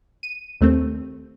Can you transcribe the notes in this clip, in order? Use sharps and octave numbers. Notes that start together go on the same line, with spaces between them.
D#7
D#2 A3 C4